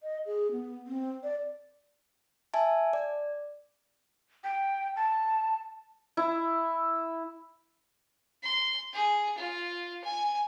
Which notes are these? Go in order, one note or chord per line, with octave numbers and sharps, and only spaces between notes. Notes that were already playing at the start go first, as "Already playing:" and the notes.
D#5
G#4
B3
C4
D5
E5 G#5 A5
D5
G5
A5
E4
C6
G#4
F4
G#5